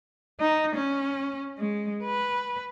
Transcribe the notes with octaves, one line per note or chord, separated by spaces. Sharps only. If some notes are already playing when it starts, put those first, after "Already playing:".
D#4
C#4
G#3
B4